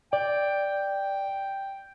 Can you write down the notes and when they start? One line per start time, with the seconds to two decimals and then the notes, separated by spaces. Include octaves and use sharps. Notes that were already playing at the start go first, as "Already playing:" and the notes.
0.13 D5 G5